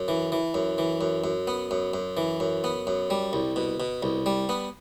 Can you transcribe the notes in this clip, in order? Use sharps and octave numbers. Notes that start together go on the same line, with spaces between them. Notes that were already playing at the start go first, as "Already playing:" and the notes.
Already playing: F#2
E3
E3
F#2
E3
F#2
F#2
B3
F#2
F#2
E3
F#2
B3
F#2
G3
C2
B2
B2
C2
G3
B3